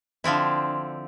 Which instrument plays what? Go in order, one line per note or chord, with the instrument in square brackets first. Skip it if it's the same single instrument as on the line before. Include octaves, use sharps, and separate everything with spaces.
[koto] D3 F3 C4 E4